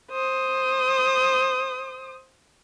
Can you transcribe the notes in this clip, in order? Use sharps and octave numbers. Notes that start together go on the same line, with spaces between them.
C5 D#6